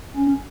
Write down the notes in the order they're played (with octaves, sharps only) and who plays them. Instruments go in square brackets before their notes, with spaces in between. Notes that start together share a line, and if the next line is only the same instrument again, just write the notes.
[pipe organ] C#4